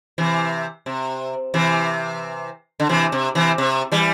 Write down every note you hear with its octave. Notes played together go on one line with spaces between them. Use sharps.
C3 E3
C3
C3 E3
D3
C3 E3
C3
C3 E3
C3
E3 G3